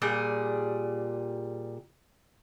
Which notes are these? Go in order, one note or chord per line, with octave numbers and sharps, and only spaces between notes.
A#2 G3 G#4